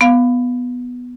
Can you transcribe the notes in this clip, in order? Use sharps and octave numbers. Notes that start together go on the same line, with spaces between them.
B3 F5